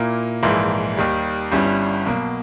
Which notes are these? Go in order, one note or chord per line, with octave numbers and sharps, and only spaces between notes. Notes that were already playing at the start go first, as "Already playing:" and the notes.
Already playing: A#2 A#3 E4
A#1 G#2 E3 A#3 E4
D#2 D#3 G3
G1 G2 G3 C#4 E4
B1 B2 A#3